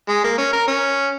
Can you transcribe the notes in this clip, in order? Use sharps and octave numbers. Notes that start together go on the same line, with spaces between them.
G#3
A#3
C#4
A#4
C#4